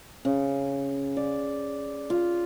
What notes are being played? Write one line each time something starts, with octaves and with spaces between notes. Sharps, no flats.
C#3
D5
F4